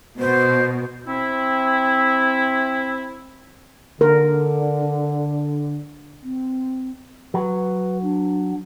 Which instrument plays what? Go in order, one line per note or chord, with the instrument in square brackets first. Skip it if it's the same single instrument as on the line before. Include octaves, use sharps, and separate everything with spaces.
[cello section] B2 [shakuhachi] C5
[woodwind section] C4 E4
[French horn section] D3 [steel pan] A#4
[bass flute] C4
[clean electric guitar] F#3 [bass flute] B4
[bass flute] D4